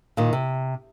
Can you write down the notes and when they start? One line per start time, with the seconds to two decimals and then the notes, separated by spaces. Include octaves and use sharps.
0.17 A#2 D#3
0.33 C3